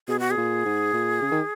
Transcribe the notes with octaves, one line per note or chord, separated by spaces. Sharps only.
B2 G#4
F#4
G#4
A#2
G#2
A#2
C#3
D#3